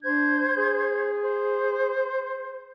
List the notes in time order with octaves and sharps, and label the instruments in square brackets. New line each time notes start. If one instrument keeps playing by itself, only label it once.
[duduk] D4 [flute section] C5 G6 G#6
[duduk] G#4
[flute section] C5